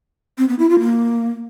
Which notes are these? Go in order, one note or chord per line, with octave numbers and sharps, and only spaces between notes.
C4
B3
E4
F4
A#3